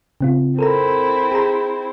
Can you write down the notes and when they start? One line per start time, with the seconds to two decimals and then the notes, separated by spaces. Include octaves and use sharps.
0.21 C#3 C4 F4
0.59 C4 E4 A4 A#4 A#5
1.32 G#4 A#5